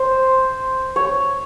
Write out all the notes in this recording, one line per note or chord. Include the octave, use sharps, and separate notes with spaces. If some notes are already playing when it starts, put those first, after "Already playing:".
Already playing: C5
C#5